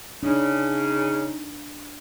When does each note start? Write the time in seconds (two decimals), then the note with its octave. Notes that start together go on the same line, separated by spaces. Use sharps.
0.23 C#3 D4 D#4